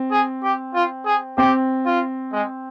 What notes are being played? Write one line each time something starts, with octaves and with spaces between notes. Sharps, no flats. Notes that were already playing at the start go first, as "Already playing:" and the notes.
Already playing: C4
G#4
G4
F4
G#4
C4 G4
F4
G#3